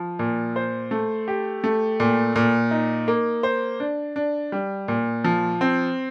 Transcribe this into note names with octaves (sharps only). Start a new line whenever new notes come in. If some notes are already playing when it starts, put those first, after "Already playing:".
Already playing: F3
A#2
C5
A3
G4
A3
A#2
A#2
D#4
A#3
C5
D4
D4
G3
A#2
F3
C4